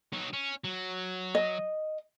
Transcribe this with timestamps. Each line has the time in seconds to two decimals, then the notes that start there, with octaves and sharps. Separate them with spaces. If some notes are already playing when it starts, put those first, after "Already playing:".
0.13 F#3 D#4
0.33 C#4
0.64 F#3
1.35 D#5